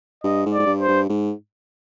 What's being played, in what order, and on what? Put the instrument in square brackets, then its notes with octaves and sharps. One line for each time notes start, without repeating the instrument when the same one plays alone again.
[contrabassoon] G2 [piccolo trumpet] D#5
[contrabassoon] G#2
[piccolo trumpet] D5
[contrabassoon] G#2
G2
[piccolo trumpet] C5
[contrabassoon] G2
G#2